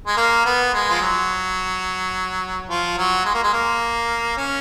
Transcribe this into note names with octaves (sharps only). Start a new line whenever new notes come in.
G#3
A#3
B3
G#3
F3
F#3
F3
F#3
G#3
A#3
G#3
A#3
C#4